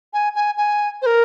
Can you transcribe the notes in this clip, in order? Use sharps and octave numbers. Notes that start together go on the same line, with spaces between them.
G#5
G#5
G#5
C5
A#4